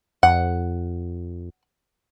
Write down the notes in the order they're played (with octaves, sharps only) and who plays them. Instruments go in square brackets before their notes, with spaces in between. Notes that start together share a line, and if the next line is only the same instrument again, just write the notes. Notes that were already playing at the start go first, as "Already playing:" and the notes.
[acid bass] F2 [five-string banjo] F#5